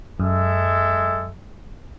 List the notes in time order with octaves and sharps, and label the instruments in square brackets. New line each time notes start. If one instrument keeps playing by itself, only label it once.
[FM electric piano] F#2 [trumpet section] G#3 A4 E5